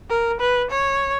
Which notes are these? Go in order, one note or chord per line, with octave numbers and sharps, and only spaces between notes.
A#4
B4
C#5